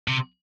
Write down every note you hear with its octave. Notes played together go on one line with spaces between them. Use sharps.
C3